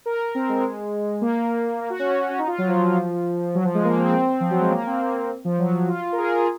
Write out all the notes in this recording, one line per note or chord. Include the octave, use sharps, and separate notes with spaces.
A#4
C4
G#3
A#3
A#3
F#4
C#4
C#4
C#4
D#4
F4
F#3
F3
F#3
F3
G#3
A#3
C4
F3
F#3
G#3
A#3
C4
A#3
F3
F#3
F4
A#4
G#4
A#4
G#4